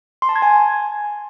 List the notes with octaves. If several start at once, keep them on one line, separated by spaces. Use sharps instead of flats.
C6
A5
G#6
G#5